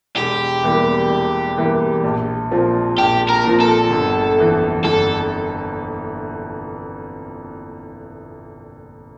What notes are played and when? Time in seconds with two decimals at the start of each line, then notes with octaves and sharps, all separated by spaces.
0.16 E1 G4
0.63 E2 E3 G3 A#3
1.11 E1
1.57 E2 E3 G3 A#3
2.04 A#1
2.51 A#2 F3 C4
2.97 A#1 G4
3.29 A#4
3.44 A#2 F3 C4
3.60 A4
3.91 G1
4.38 F2 E3
4.84 G1 A4